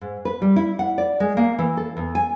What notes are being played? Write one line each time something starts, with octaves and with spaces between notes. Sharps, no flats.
G#2
B4
G3
E4
F#5
D5
G#3
A#3
E3
A4
E2
G#5